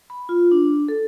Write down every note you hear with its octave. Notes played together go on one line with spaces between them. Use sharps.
B5
F4
D4
A4